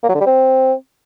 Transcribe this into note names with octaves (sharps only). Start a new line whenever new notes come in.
A#3
F#3
D3
G3
C4